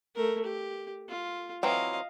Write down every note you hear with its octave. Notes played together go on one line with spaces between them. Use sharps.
A3 A#4
G4
F4
E3 F#3 C4 D#5 F5